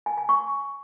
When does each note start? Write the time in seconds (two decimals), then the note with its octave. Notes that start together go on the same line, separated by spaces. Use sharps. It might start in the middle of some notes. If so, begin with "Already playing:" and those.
0.06 G#5
0.18 G#5
0.29 C#6